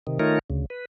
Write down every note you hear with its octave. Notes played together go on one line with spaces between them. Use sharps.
C3 D#3
D#3 A3 D#4 F4 A#4 C#5
D2 C#3
B4